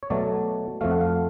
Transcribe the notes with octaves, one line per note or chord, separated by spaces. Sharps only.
C#5
B2 F#3 A3 D5
F2 F3 A3 F5
F#5
F5